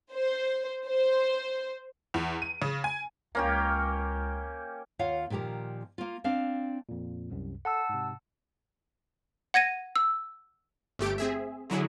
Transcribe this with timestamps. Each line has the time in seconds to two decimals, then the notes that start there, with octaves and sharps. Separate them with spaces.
0.13 C5
0.86 C5
2.14 E2
2.42 D#7
2.62 C#3
2.84 G#5
3.35 C#2 A#3 C#4 G4
4.99 D#2 F4 C#5 F5 F#5
5.30 A#2 D#3 F3 G4 A#4
5.98 A#3 F4
6.24 C4 D4 F5
6.89 F2 A#2
7.31 C2 F#2 C3
7.65 A4 F#5 A5 E6
7.89 G#2 C3
9.54 F#5 G#6 A#6 D#7
9.96 E6
10.99 G1 A3 G4 D7
11.18 C4 G#4 E5
11.70 D3 F#3 E4 G#4